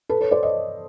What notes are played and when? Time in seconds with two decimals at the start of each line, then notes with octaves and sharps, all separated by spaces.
0.09 A4 B4
0.21 B4 C#5
0.31 C5 D5
0.43 C#5 D#5